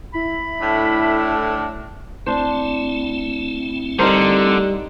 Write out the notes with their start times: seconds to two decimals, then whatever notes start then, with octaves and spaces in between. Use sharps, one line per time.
0.14 E4 B5
0.61 A2 A3 D4
2.26 A3 C4 D4 E4 C5
3.99 D3 G3 D#4 A#4 C5